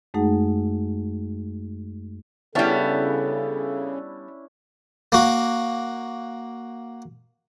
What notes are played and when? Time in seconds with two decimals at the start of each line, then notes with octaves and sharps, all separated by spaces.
0.14 F#2 G#3 A3 D#4 G#4 F#5
2.55 C#3 G3 B3 C#4 D4 E4 A4
5.12 A#3 F#4